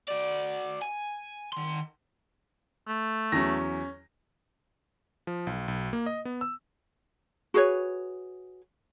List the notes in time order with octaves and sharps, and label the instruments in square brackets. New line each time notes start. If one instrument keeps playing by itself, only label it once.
[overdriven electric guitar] F#4 D5
G#5
D#3 C6
[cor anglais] A3
[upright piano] E2 F#3 [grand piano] C#4 A#6
[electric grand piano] F3
B1
B1
A#3
D#5
B3
E6
[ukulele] F#4 G#4 B4 C#5